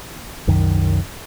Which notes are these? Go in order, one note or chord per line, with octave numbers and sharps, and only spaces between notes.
C2 F#2 D#3